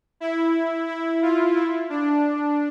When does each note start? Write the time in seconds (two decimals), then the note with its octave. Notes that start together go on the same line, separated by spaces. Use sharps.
0.20 E4
0.88 E4
1.22 F4
1.56 E4
1.90 D4